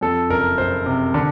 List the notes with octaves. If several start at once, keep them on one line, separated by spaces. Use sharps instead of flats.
F2 A4
F#1 A#4
F#1 C5
C3
D3